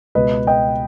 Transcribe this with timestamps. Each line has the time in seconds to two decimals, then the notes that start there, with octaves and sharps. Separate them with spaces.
0.15 C#2 B2 B4 D#5
0.47 D#5 G5